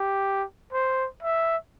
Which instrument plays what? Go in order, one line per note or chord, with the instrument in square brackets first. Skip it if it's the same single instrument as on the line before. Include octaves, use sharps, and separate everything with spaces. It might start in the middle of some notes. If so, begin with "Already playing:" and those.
Already playing: [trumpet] G4
C5
E5